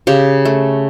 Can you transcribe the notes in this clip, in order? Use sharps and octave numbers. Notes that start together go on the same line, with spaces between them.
C#3 G4
A3